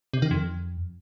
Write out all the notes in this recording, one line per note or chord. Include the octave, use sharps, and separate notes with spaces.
C3
D#3
F2